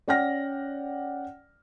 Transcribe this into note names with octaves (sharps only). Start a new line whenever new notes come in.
C#4 D5 F#5 G5 F6 A#6